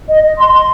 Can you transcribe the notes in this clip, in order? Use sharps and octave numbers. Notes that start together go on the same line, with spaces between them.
D#5
D#5
C6
C6